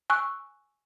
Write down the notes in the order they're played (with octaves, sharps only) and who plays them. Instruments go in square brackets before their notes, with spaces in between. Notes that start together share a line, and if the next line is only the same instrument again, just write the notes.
[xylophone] G#5 C#6 E6 F#6